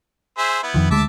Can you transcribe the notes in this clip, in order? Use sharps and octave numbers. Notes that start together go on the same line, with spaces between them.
G#4 C5 E5
B3 E4
F2 D#3 F3
D2 G#3 E5 A5 D6